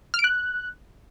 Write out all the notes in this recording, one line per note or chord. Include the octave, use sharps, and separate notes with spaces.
F6
D7
F#6